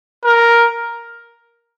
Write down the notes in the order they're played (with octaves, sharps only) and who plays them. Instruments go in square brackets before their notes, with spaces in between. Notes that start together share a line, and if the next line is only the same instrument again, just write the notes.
[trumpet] A#4